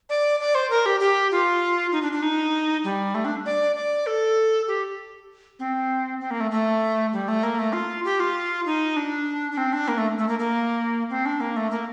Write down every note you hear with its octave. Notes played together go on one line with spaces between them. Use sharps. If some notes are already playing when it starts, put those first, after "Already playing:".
D5
D5
C5
A#4
G4
G4
F4
D#4
D4
D4
D#4
G3
A3
D4
D5
D5
A4
G4
C4
C4
A#3
A3
A3
G3
A3
A#3
A3
F4
G4
F4
D#4
D4
D4
C4
D4
A#3
A3
A3
A#3
A#3
C4
D4
A#3
A3
A#3